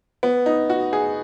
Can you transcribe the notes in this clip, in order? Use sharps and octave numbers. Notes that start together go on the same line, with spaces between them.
B3
D#4
F#4
G#4